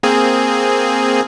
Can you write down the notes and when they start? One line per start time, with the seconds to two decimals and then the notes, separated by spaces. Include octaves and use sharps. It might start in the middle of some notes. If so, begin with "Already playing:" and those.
0.03 A#3 C4 G#4